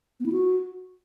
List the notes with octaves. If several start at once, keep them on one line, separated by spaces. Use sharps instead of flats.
B3
E4
F#4